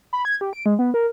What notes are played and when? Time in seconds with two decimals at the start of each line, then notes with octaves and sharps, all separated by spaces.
0.13 B5
0.25 G#6
0.41 G4
0.53 D7
0.66 G#3
0.79 B3
0.94 A#4